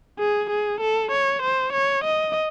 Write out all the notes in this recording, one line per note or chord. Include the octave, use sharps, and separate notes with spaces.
G#4
G#4
A4
C#5
C5
C#5
D#5